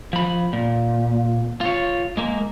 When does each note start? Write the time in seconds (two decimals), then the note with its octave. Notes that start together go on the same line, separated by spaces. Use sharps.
0.13 F3 B5
0.53 A#2
1.61 F4 C#5
2.17 G#3 A#3